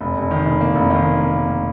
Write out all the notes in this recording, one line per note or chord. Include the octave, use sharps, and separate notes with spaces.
F1
F1
D#3
F1
A#3
F1
D#3
A#3
A#3
A#3